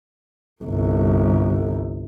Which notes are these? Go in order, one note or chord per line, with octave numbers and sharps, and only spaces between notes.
G1 C2